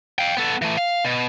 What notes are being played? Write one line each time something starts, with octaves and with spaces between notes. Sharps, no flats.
F5 G5
B3 A4
E3 A3
F5
B2